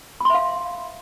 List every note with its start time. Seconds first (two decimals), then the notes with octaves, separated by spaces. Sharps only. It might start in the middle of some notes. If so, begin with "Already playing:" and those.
0.20 B5
0.25 C6
0.30 E5
0.34 F5